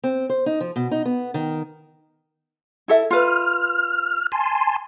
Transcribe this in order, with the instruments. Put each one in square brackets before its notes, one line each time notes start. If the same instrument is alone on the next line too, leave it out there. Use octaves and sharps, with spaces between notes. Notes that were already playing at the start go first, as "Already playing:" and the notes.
[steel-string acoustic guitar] C4
C5
D#4
F3
B2
D#4
B3
D#3
[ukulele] E4 A4 E5
[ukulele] F4 B4 [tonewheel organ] F6
[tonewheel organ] G#5 A5 C6